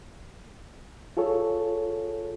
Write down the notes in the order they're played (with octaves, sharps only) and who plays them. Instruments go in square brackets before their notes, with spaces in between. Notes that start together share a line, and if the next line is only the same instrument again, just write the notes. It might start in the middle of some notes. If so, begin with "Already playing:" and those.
[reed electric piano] F4 G#4 A4 C#5